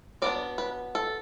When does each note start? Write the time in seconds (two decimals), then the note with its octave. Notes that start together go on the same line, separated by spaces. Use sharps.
0.22 F#3 B3 D4 D5
0.58 B4
0.95 A4